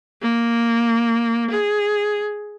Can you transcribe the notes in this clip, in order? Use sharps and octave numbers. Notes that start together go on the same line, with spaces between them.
A#3
G#4